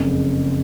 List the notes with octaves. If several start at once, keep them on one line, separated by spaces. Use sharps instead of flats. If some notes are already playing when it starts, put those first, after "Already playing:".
Already playing: F#1 F2 C#3